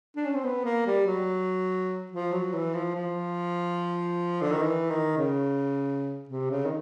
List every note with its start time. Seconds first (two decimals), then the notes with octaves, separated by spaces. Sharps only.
0.16 D4
0.25 C#4
0.35 C4
0.44 B3
0.65 A#3
0.86 G3
1.06 F#3
2.12 F3
2.32 F#3
2.53 E3
2.74 F3
2.95 F3
4.41 D3
4.52 D#3
4.62 E3
4.90 D#3
5.18 C#3
6.29 C3
6.51 C#3
6.66 D#3